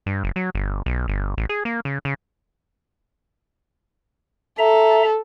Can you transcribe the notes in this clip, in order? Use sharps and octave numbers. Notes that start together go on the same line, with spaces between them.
G2
F#1
F#3
G1
B1
G1
A1
G#4
A#3
C#3
C#3
A4 E5 A#5